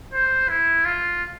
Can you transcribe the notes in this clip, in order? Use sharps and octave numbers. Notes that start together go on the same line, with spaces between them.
C5
E4
F4